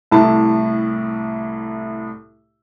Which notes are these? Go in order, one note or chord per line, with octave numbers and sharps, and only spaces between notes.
C2 A2 E4 A5